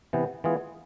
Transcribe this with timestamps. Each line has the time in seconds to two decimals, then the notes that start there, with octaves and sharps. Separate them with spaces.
0.13 C3 E3 B3
0.44 E3 G#3 B3 F4 G#4